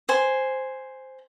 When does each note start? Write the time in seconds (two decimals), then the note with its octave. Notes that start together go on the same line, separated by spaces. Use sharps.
0.09 C5 G#5